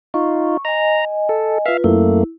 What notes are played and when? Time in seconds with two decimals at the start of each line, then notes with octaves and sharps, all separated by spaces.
0.14 D#4 F4 C#6
0.65 D#5 G#5 A#5
1.29 A4
1.66 F4 B4 E5 F5
1.84 F#2 A3 A#3 E4